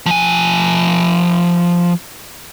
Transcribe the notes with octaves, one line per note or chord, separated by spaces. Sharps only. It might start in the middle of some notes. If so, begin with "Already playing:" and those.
F3 G#5